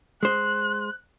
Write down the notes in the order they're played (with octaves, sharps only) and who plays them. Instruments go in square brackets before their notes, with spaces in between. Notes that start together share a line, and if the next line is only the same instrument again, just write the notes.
[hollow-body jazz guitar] G#3 C5 [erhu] F#6